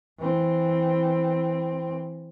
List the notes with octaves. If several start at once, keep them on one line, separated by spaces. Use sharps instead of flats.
E3 C4